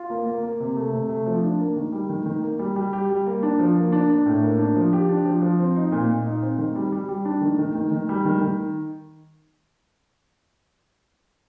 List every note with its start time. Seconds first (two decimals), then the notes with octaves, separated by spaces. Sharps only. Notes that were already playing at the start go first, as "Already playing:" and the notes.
Already playing: F4
0.10 A#3
0.26 A#3
0.43 A#3
0.60 C3
0.76 A3
0.93 C3
1.09 A3
1.26 F3
1.43 D4
1.60 A#3
1.76 D#3
1.92 G3
2.09 D#3
2.26 D#3
2.43 A#3
2.59 G3
2.76 G3
2.93 G4
3.09 G3
3.26 A#3
3.43 D4
3.59 F3
3.76 A#3
3.92 D4
4.10 D4
4.26 A2
4.43 A#3
4.59 D4
4.76 F3
4.93 G4
5.09 D4
5.25 F3
5.42 F3
5.59 C4
5.76 D#4
5.92 A#2
6.09 A#2
6.26 D#4
6.42 C4
6.58 D#3
6.76 G3
6.92 G3
7.09 G3
7.25 D4
7.41 D#3
7.59 D#3
7.75 D#3
7.92 D#3
8.09 G3
8.25 D#3
8.41 D#3